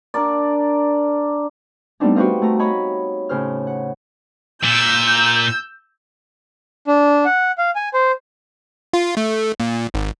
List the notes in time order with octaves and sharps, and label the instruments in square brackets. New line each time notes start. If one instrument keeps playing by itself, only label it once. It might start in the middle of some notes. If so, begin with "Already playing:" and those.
[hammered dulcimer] D4 A#4 D5
[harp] G3 A3 B3 C4 D4 D#4
F#4 G4 B4 C5 D#5 F5
A3 A#5
C#5 D#5 A#5 B5
A2 C#3 C5 F6
F#5
[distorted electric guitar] A#2 [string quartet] E6 G6
[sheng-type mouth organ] D4
F#5
F5
G#5
C5
[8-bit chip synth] F4
A3
A#2
G#1